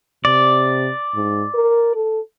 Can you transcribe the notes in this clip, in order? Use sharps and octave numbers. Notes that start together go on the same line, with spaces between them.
C3 D5
G#2
A#4
A4